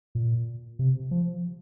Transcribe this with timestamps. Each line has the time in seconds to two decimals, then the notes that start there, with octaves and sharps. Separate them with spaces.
0.15 A#2
0.79 C3
1.11 F3